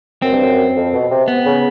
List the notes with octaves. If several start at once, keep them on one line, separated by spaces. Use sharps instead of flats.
F#2 C4
G2
F#2
F2
B2
C3
B3
C#3